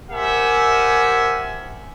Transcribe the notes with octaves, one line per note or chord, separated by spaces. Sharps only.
G4 A#4 C5 E5 F#5 G#5